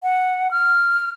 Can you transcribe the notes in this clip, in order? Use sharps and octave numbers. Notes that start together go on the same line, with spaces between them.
F#5
F6